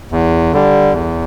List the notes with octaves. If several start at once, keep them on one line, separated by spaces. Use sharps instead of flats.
E2
D3 G3
E2